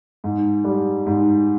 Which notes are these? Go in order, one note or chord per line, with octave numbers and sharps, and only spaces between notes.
G#2
G3
G#2